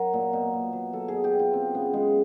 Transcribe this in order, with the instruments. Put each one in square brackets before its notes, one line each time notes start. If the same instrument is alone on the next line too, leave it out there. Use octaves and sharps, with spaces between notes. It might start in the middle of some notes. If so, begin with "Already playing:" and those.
Already playing: [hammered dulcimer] F#3 A#4
A#2
B2
B2
F#3
F#3 A4
G#4
B2
G4
B2
F4
C#3 C4
C#3 B3
F#3 G#3